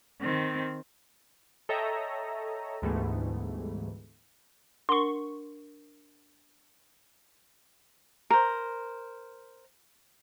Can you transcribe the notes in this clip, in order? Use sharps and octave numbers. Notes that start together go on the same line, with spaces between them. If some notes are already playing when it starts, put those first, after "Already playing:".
D#3 C4
A4 C#5 D#5 E5 G5 A#5
D2 G#2 E3 G3 A3 B3
D4 A#4 F#5 C6 C#6
A#4 C5